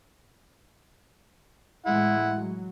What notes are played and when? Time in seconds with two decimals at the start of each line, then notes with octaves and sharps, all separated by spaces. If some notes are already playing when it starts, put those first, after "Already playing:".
1.86 A2 E3 G#3 E4 F#5
2.34 F#3